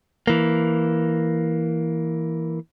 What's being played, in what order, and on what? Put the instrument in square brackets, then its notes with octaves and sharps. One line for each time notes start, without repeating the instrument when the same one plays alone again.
[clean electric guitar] E3 A#3